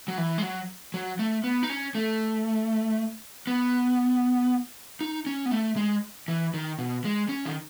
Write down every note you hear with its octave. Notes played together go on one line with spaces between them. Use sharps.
F#3
E3
G#3
F#3
F#3
A3
B3
D#4
C#4
A3
B3
D#4
C#4
B3
A3
G#3
E3
D#3
B2
G#3
C#4
D#3